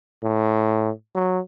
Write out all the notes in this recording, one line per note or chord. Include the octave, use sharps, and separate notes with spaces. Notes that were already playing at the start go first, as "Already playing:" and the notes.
A2
F#3